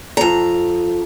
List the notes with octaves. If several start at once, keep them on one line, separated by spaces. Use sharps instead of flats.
F2 A#5